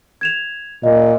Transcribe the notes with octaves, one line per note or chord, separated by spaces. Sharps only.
G#6 E7 F7
A#2 D#5